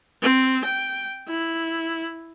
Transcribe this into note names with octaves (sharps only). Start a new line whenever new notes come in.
C4
G5
E4